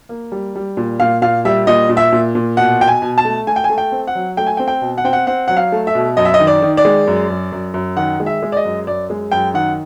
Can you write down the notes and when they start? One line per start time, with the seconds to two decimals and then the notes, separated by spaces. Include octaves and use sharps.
0.09 A#3
0.32 G3
0.55 G3
0.77 A#2
1.00 A#2 F5
1.22 A#2 F5
1.45 G3 E5
1.67 A#2 D#5
1.89 A#2
1.97 E5
2.12 A#2
2.35 A#2
2.57 B2 F#5
2.80 B2 G5
2.88 G#5
3.02 B2
3.18 A5
3.25 A3
3.47 A3 G#5
3.56 G5
3.64 G#5
3.69 A3
3.78 G5
3.92 C4
4.07 F#5
4.15 F#3
4.37 A3 G5
4.47 G#5
4.57 C4 G5
4.68 G5
4.82 B2
4.98 F#5
5.04 C4 G5
5.13 F#5
5.27 C4 F#5
5.48 F#3 F#5
5.57 F5
5.72 A3
5.87 E5
5.95 B2
6.17 F#2 D#5
6.25 E5
6.34 D#5
6.40 D#3
6.47 D5
6.62 D#3
6.77 D5
6.85 G#3
7.07 F#2
7.30 F#2
7.52 F#2
7.74 F#2
7.96 D#3 F#5
8.20 G#3
8.26 E5
8.42 G#3
8.52 D5
8.57 D#5
8.65 F#2
8.87 F#2 D5
9.10 G#3
9.32 F#2 G5
9.54 D#3 F#5